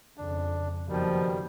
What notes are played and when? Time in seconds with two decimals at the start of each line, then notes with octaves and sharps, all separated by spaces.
0.18 F2 C#3 D4
0.89 F#1 B2 D#3 F3 G3